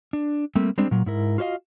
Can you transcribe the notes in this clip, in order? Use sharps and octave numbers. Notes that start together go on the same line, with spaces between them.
D4
G3 A3 A#3 C4
G3 G#3 C4 D4
A#2 F#3
G#2 E4 A#4
F4 F#4 C5 D#5 F5